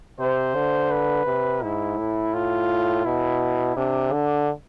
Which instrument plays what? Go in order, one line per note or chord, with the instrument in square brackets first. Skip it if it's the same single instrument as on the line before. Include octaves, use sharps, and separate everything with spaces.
[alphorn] C3 [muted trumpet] C5
[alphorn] D3
[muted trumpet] B4
[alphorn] C3
[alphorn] G#2 [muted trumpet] E4
[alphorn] A2
[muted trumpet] F4
[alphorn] B2 [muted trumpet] E4
[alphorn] C3 [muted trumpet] D4
[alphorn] D3